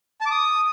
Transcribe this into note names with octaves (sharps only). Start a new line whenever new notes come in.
A5
D6
D#6